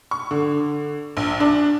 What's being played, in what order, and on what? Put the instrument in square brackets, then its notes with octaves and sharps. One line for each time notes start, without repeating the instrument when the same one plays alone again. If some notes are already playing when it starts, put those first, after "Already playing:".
[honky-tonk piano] C#6
D3
A#1
D4